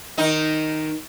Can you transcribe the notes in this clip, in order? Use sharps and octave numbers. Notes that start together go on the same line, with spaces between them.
D#3 D#4